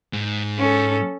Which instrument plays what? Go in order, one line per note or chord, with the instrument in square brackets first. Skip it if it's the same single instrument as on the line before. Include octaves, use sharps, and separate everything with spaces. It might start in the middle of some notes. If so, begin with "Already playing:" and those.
[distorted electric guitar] G#2
[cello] C#4 A4